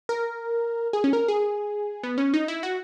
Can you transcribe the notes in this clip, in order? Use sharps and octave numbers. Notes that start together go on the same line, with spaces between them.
A#4
G#4
C#4
A#4
G#4
B3
C#4
D#4
E4
F#4